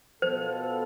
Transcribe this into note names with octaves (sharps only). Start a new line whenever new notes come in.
B2 B3 F4 A4 C5